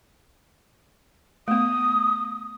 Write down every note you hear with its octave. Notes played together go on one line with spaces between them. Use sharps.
A3 B3 D#6